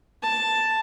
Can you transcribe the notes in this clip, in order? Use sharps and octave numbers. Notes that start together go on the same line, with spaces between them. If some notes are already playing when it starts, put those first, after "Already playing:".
A5